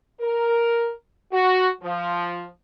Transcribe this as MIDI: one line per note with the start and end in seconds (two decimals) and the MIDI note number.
0.21 0.90 70
1.32 1.67 66
1.82 2.43 53